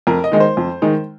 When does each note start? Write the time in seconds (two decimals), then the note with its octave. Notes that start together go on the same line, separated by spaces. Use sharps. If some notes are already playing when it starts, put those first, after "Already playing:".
0.07 F2 A#4
0.24 D#5
0.32 D#3 G#3 D#4
0.40 C5
0.57 F2
0.82 D#3 G#3 D#4